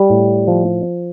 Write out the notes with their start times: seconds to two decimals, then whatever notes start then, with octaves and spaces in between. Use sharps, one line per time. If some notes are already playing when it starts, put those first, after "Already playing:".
Already playing: G3
0.10 A2
0.48 F3